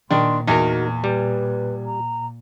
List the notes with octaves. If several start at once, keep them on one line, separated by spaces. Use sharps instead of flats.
A#2 D#3 D4 C6
E2 D#4 F#4 A#4
G3 B4
A#5